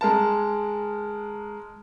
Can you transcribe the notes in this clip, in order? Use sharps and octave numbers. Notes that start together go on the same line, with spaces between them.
G#3 A#4 A5